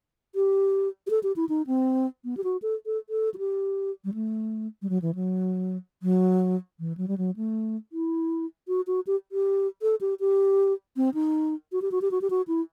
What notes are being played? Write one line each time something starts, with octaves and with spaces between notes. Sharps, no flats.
G4
G4
A4
G4
E4
D#4
C4
B3
G4
F#4
A4
A4
A4
F#4
G4
G3
A3
G3
F#3
E3
F#3
F#3
E3
F#3
G3
F#3
A3
E4
F#4
F#4
G4
G4
A4
G4
G4
C4
D#4
F#4
G4
F#4
G4
F#4
G4
F#4
E4